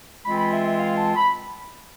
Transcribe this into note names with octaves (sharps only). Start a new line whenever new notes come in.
E3 G#3 C4 F4 B5
B5
E5
E5
F5
A5
B5